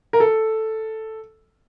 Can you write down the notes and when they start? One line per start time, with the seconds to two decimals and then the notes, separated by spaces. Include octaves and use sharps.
0.13 A#4
0.20 A4